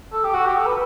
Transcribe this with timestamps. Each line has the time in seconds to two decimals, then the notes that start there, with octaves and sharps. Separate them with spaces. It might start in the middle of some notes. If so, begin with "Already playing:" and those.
0.13 A4
0.24 G4
0.34 F#4
0.46 G4
0.57 A4
0.67 B4